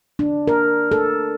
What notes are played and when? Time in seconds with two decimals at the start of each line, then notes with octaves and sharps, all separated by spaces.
0.19 D4
0.48 A#4
0.92 A4